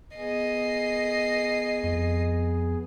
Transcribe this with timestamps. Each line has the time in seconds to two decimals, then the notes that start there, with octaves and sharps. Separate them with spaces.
0.17 B3 G#4 D#5 C7
1.83 F2